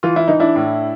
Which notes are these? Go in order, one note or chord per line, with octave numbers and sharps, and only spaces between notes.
E3 F4
E4
E3 D#4
D4 E4
A2